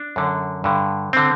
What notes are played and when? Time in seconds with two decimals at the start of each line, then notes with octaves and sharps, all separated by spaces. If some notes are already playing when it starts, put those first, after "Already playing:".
Already playing: D4
0.16 F#2 D3
0.64 G2 D3
1.13 D3 C4